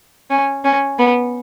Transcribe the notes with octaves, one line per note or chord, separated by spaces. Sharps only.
C#4
C#4
B3